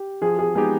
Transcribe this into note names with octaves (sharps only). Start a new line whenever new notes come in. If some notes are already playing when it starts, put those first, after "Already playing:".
Already playing: G4
F3 G#4
G#4
G#3 B3 D#4 G4 G#4